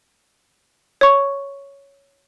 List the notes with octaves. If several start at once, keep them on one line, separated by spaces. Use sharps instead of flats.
C#5 C#6